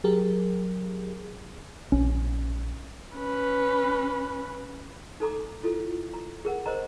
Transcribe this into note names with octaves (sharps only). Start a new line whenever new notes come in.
F#3 G4 G#4 A#4
A#1 C#4
C#4 B4
D#4 A4 A#5 D6
E4 F4 A4
A#5
G#4 A#4 F#5
A#4 C5 D#5 A#5